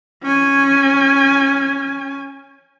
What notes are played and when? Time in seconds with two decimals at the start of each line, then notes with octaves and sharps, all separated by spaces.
0.23 C#4 G#5